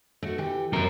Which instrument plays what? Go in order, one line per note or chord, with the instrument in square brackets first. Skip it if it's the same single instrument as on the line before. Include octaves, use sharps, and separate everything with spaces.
[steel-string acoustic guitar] A3 F#4
E3 G4
[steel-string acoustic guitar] F2 G5 [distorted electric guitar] F#3 A#4